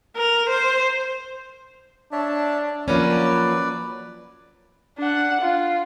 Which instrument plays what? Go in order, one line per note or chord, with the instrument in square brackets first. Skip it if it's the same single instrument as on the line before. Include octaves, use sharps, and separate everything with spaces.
[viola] A#4
C5
[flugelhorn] D4 [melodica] C#5 E5 A5
[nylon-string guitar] F3 A#3 C#4 [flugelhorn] F#3 [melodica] B4 D5
[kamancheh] D4 F#5
F4